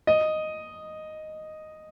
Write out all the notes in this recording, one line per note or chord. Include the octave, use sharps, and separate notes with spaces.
D#5